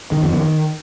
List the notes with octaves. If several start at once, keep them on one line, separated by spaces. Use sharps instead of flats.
D#3
F2
D#3